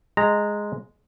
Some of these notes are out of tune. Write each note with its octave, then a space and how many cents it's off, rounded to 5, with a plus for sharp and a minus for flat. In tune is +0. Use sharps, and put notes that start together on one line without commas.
G#3 +0 A#5 -10